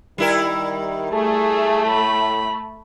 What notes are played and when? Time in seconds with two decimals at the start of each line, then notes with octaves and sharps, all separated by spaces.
0.18 D#3 G3 E4 A#4
1.12 A3 G#4
1.86 A2 B5